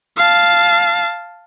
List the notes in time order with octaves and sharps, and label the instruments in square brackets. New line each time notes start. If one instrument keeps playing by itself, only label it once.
[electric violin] F5 A5